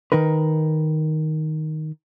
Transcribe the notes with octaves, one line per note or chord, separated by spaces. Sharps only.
D#3 D#4 A#4 B4